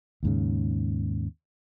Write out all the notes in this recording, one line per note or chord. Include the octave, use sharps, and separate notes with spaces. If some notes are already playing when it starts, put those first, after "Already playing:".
D#2 G#2 C#3